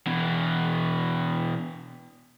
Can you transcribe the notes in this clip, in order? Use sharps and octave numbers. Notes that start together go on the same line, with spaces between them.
B2 E3